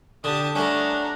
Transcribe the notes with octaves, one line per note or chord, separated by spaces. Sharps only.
D3 G4 A5 D#6
A3 C#4 D4 F#5 A#5